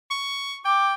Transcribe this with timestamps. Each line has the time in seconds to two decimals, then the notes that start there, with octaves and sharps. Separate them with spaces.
0.11 C#6
0.65 G5 D6